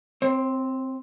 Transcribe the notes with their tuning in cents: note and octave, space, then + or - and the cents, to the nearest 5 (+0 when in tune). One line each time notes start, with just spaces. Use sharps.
C4 +0 C5 +45